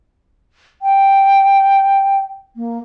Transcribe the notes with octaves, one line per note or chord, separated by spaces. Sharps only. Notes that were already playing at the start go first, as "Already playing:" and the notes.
G5
A#3